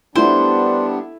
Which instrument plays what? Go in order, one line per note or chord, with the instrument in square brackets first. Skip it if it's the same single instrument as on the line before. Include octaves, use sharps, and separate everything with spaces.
[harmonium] G3 B3 D4 [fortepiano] A3 E4 [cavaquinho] C5